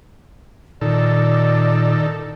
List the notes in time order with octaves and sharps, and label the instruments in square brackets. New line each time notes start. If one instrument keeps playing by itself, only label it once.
[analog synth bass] A#2 [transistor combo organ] D#3 A4 [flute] D5